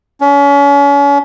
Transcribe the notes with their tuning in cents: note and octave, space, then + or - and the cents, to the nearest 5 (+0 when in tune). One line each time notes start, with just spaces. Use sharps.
C#4 +35